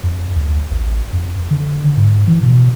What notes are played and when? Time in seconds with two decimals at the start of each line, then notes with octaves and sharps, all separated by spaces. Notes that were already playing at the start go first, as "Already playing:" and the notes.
0.04 F2
0.36 D2
0.71 A1
1.13 F2
1.51 D3
1.97 G#2
2.27 E3
2.42 B2